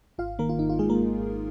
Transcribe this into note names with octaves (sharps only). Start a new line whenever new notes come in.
G#1 F4 F5
D#3 A#3 A#4
F4
G#1 D#4
F4
G#1 G#3 G#4
A#3 A#4
G#1
G#1